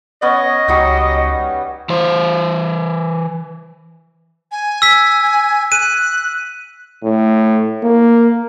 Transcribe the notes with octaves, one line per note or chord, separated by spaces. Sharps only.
B3 C#4 D#5
C#2 F#3 G3 D#4
E3 C5
G#5
E6 B6
F#6 D#7
A2
A#3